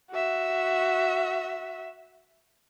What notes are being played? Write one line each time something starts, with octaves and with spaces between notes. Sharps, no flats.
F#4 E5